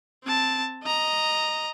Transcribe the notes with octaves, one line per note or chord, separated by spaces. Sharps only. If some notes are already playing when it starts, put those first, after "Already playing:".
C4 A5
D#5 A#5